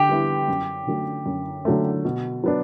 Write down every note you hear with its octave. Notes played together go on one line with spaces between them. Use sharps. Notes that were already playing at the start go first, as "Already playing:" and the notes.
Already playing: D3 G4 G5
G3 B3 E4
F#2
D3 F#3 A3
F#2
D3 F#3 A3
B2
F#3 B3 D4